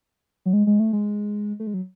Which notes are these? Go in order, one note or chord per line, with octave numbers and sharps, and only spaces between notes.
F#3
G#3
G#3
A3
G#3
A3
G#3
F#3